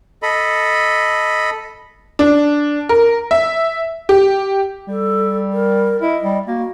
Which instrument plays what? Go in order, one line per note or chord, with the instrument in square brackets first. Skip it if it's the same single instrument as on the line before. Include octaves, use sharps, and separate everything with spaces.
[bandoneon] A4 D#5 B5
[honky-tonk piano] D4
A#4
E5
G4
[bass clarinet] G3 [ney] A4
[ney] A#4
[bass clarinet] E4 [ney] D#5
[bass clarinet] G3
[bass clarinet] A#3 [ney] F#4